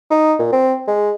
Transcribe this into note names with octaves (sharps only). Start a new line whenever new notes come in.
D#4
A#2
C4
G#3